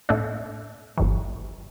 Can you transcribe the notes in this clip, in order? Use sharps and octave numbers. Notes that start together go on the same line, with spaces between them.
A2 A3 D4
G1 G2 E3